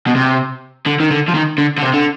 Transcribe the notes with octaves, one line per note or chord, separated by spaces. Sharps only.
B2
C3
D3
D#3
D3
F3
D#3
D3
D3
C3
D3